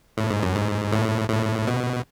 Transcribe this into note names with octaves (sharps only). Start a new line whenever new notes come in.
A2
G#2
F#2
G#2
A2
A2
B2